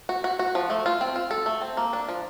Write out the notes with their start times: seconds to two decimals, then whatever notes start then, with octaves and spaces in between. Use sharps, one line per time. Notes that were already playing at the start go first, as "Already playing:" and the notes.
0.09 F#4
0.24 F#4
0.39 F#4
0.55 F3
0.70 A3
0.86 F4
1.01 C4
1.16 F4
1.31 A4
1.46 A3
1.61 C4
1.77 A#3
1.93 D4
2.08 F3